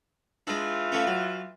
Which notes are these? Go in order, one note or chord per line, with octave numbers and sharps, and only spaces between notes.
E3 G#3 D4 F4
F3 A3 C#4
F#3